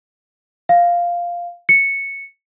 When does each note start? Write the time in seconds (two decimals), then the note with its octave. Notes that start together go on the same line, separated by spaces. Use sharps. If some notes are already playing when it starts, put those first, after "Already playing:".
0.69 F5
1.69 C#7